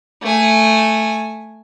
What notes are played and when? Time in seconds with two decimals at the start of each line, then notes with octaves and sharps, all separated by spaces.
0.22 A3 G#5